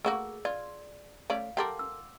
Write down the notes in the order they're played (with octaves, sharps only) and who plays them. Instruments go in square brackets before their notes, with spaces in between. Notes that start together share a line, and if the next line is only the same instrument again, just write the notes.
[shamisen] A3 A#3 F#4 [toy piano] G#4 E6
[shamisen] F4 [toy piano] D5
[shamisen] A3 C#4 D5 [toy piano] F5
[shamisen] G4 A4 A#4 [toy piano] F#5 C6 D6
[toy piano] E6